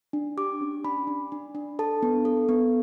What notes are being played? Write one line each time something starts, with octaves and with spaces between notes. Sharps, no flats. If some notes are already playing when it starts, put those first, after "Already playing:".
D4
G4 D6
C#4
D4 B5
D4
D4
D4
A4 A5
B3
A4
B3